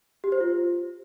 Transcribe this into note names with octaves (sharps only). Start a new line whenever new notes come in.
G4
C5
F4